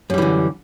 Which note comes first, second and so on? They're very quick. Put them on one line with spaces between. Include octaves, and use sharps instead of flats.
F#2 G3 E3 D3